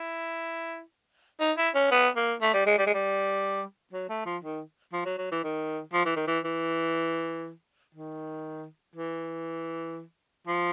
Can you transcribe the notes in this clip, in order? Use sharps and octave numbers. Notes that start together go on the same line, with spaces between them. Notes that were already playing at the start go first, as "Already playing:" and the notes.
Already playing: E4
D#4
E4
C#4
B3
A#3
A3
G3
G#3
G3
G#3
G3
F#3
A3
F3
D#3
F3
F#3
F#3
E3
D#3
F3
E3
D#3
E3
E3
D#3
E3
F3